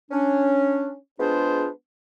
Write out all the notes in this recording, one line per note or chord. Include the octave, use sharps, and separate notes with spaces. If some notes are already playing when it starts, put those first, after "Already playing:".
C#4 D4
G#3 B3 D4 F4 G#4 C5